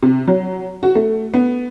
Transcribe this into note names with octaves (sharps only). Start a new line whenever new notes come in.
C3
F#3
F#4
A3
B3